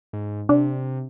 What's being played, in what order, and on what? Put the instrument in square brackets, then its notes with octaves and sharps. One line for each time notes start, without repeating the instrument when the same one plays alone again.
[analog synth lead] G#2
[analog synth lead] C3 [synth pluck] D4